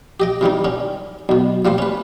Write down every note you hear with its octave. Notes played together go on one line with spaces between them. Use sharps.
G4 D#5 G5
C3 E3 G3 D#4
D3 C#4
B1 B2
F3 G3 A3 C5
C#4 B4